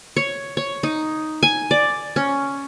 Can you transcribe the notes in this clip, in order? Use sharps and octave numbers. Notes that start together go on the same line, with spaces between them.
C#5
C#5
D#4
G#5
D5
C#4